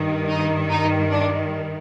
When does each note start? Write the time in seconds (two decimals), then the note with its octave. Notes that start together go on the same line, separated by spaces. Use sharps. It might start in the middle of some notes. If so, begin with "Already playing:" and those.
Already playing: G2 D#3
0.29 D#4
0.69 D#4
1.10 D4